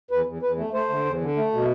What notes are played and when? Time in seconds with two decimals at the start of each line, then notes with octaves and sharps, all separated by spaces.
0.11 E2 B4
0.26 E2
0.42 E2 B4
0.58 A3
0.74 A3 C5
0.89 D3
1.05 E2
1.21 D3
1.37 A3
1.53 B2